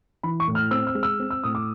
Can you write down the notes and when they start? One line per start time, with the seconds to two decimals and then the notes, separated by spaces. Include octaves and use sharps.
0.23 E3 B5
0.40 C#6
0.47 A2
0.55 F6
0.71 C4 E6
0.87 E6
0.95 G#3
1.03 E6
1.20 C4
1.30 E6
1.43 A2 D#6
1.55 D6